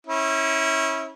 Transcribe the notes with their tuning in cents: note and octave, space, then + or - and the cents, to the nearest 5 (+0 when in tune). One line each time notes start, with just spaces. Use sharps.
C#4 -25 E4 -30